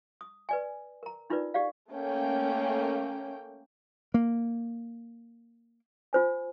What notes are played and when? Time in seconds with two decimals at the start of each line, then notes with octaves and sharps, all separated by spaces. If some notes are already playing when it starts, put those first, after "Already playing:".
0.21 D#6
0.49 B4 D5 G#5
1.03 A#4 A#5
1.30 D4 D#4 F4 A#4 B4 D5
1.54 G4 D5 F5
1.91 A3 A#3 C#4 G5
4.14 A#3
6.13 F4 C5 G#5